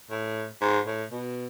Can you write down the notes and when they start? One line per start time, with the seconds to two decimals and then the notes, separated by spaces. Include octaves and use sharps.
0.11 A2
0.61 G#2
0.87 A2
1.12 B2